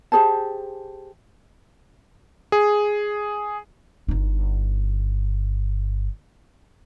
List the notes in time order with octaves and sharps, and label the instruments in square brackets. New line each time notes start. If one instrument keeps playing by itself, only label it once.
[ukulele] G4 G#4 C5 A5
[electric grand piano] G#4
[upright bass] G1 D#4